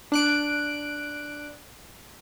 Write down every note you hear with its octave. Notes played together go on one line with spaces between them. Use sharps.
D4 F#6 D7